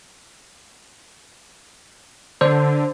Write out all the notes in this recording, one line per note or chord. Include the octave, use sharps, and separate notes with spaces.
D3 C5